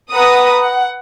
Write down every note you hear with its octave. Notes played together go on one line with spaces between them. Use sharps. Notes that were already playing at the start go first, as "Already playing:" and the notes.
B4 F#5 A#5 D#6
F#5